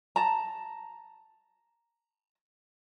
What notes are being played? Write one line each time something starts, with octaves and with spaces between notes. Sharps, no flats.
A5 A#5